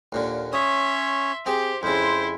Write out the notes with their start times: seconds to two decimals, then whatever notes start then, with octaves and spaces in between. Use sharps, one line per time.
0.12 D#2 A#2 D3
0.53 C#4 C#5 E5 C6 D#6
1.46 C4 G4 G#4 C5
1.83 F2 C#3 E4 C5 C6